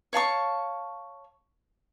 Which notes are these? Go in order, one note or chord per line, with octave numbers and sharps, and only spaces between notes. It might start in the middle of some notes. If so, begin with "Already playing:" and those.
C#5 F5 A5 C#6